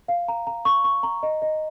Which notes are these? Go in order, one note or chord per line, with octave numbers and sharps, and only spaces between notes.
F5
A#5
A#5
C#6
C#6
A#5
D#5
D#5